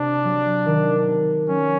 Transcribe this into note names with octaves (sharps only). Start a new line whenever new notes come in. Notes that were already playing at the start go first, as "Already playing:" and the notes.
Already playing: C3 D4
F#3
D#3
C3
F#3 C#4